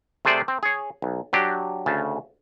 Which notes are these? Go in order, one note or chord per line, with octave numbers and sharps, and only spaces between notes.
C3 A3 G#4 C5 D5
C4
G#4 C#5
B1
F#3 D4 G4
D2 C#3 A5